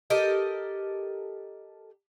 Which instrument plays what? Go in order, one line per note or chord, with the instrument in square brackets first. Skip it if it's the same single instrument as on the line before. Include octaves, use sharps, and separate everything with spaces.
[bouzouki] G4 A4 A#4 D#5